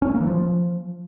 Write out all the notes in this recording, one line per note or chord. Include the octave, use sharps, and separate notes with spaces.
C#4
A3
A#3
E3
F3